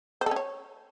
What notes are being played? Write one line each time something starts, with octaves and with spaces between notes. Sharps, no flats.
C5
A4
C#4
C#5